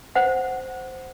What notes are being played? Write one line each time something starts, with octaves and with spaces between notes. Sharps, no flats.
C5 F#5